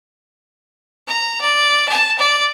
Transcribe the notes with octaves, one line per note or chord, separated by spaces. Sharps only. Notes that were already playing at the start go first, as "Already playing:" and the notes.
A#5
D5
A5
D5